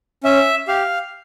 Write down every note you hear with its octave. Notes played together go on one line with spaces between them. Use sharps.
C#4 E5
G4 F5